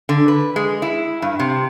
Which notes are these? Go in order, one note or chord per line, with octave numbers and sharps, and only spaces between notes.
D3
B4
G#3
E4
G2
C3